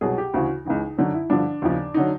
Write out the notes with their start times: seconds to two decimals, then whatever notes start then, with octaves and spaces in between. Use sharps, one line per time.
0.01 C2 B2 F#3 G#4
0.18 G4
0.34 D2 C#3 E3 F#4
0.65 C#2 C#3 E3 D#4
0.97 F#2 D3 F#3 D#4
1.14 E4
1.30 G2 D3 F3 D4
1.62 D#2 C#3 F3
1.94 D3 F#3 D#4